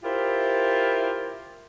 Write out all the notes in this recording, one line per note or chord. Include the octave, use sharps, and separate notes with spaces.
E4 F4 G4 A#4 C5